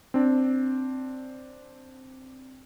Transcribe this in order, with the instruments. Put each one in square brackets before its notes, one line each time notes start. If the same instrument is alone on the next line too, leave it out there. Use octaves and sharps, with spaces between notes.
[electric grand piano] C4 D4